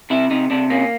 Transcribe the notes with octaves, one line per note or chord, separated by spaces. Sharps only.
C3 E4
C3 D#4
C3 D4
A#3 C#4